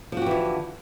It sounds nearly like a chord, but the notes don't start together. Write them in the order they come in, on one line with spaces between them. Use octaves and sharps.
F3 F#4 G4 E3 D3